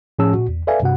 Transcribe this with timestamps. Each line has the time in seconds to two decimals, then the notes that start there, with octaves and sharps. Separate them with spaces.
0.19 A2 F3 C#4 G#4 A5 E6
0.34 A#2 F#4
0.48 E2
0.67 A4 B4 D5 E5 F5 G#5
0.82 G2 C3 F#4 F#5